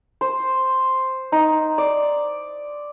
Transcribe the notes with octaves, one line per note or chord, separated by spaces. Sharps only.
C5
D#4
D5